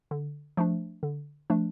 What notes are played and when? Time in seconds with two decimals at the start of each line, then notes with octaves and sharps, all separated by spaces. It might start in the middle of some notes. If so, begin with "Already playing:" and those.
0.11 D3
0.57 F3 A3 D4
1.03 D3
1.50 F3 A3 D4